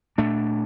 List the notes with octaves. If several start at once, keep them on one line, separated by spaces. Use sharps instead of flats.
A#2 A3 D4